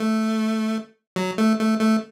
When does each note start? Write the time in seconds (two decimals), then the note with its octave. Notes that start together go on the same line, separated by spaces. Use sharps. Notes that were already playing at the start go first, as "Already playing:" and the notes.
Already playing: A3
1.16 F#3
1.38 A3
1.59 A3
1.81 A3